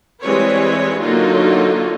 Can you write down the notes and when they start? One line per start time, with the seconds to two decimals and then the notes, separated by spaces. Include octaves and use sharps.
0.22 E3 G3 G#3 C4 B4 C#5
1.01 D3 F#3 A#3 D#4 F4 F#4